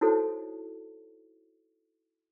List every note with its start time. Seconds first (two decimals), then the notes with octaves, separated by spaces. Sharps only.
0.01 D#4 E4 F#4 A4 C5 C#5